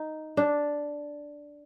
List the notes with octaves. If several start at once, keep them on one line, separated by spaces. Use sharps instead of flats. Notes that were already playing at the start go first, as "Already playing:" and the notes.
Already playing: D#4
D4